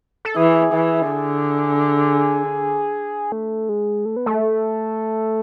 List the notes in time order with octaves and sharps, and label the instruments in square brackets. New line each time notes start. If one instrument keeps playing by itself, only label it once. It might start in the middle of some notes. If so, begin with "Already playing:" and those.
[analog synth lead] A4
[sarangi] E3 [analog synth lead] G#4
[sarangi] E3
D3
[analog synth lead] A3
G#3
A3
B3
A3